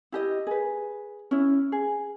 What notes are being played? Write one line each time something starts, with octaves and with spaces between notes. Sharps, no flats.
E4 G4 D#5
G#4 B4
C#4 E4
G#4